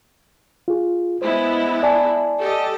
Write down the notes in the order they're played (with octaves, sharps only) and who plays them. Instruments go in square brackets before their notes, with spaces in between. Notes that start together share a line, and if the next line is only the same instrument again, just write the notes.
[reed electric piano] F4 G#4
[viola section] G#3 B3 E4 [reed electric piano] C5
[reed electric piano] D5 G#5 A5
[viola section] G4 A4 D#5